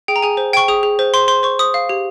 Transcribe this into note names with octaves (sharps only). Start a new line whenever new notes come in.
G#4 G5
A#5
G#4 G#5
C5
G5 C#6
G#4 D#6
G#4
C5
C5 C6
C5 C6
C5 C#6
C5 D#6
F5
G4